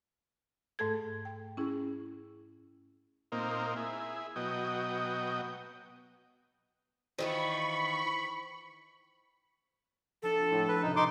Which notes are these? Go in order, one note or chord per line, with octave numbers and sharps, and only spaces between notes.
G#2 A3 A4 G#6
G5
C#4 E4 G#4
A#2 A#3 C4 D#4
E4 G#4
B2 F#3 D#5 G5
D#3 E3 F4 C5 B5 C#6
F3 D4 A4
C4 F4
A2
B4
F#2 A2 C3 D#4
D#4 C6 D6